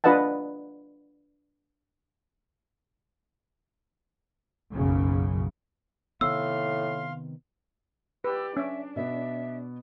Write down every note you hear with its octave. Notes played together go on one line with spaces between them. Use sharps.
D4 F4 B4 D#5 F#5 A5
F#1 B1 F#2 C#3
A2 C3 D#3 B3 F5 C6 E6
G4 B4 D5 E6
C#4 D4 E5
B2 B3 E5